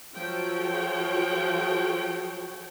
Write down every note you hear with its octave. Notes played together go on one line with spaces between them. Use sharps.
F3 F#3 F#4 A4 C#5 G5